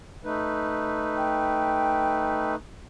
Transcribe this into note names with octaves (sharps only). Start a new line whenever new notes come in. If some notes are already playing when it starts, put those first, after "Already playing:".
A3 D#4 B4
G5